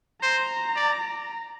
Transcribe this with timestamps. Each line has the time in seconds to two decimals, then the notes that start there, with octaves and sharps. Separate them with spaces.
0.22 C5 A#5
0.76 D5